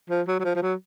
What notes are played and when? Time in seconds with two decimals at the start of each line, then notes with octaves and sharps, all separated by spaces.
0.10 F3
0.28 F#3
0.40 F#3
0.45 F3
0.56 F3
0.62 F#3